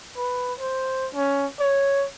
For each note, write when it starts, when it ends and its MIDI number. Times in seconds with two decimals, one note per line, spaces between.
0.17 0.53 71
0.59 1.08 72
1.14 1.46 61
1.59 2.05 73